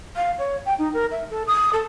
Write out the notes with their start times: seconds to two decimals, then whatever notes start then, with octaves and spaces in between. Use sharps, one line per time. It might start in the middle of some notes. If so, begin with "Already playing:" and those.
0.16 F5
0.38 C#5
0.65 G5
0.78 D#4
0.93 A#4
1.11 E5
1.30 A4
1.46 D#6
1.72 A4